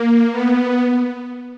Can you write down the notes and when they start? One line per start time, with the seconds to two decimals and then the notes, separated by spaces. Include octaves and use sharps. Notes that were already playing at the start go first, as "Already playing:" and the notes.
Already playing: A#3
0.32 B3